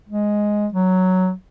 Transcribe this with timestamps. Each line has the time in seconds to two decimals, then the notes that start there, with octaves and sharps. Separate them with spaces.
0.09 G#3
0.74 F#3